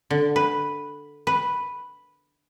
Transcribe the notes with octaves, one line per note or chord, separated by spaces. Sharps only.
D3
B4
B4